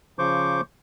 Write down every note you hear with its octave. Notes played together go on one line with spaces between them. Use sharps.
C#3 F3 C5 C#6 D6 G6